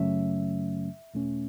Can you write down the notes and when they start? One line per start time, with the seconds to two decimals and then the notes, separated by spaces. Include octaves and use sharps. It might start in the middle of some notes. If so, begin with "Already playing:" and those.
Already playing: F#2 C#3 F#3 A3 C#4 E5
1.14 E2 B2 A3 C#4